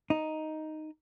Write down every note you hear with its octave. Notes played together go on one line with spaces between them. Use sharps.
D#4